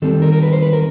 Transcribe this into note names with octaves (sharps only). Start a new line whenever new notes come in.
D#3 G3 C4 A4
A#4
A#4
B4
C5
B4
A#4